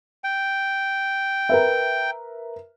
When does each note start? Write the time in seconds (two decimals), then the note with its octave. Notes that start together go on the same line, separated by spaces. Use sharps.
0.24 G5
1.49 A#4 B4 E5